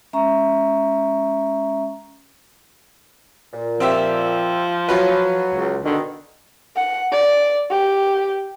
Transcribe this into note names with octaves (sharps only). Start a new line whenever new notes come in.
G#3 C#4 E5 A#5 C#6
A#2
F3 C4 G4 E5
F#3 F4 F#4 B4
C#2
B2 D3 D#3
F#5
D5
G4